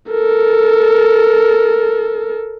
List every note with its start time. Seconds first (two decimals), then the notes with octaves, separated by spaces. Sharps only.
0.11 A4 A#4